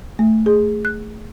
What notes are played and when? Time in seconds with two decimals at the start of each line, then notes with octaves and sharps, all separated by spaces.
0.19 A3
0.46 G#4
0.85 F#6